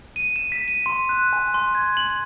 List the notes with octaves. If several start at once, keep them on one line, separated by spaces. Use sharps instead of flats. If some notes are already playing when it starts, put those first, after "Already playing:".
D#7
E7
B6
D#7
C6
F#6
G#5
C6
G#6
F#7